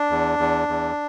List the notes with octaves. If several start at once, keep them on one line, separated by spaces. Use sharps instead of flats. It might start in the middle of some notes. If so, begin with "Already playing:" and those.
Already playing: D4
E2
E2
E2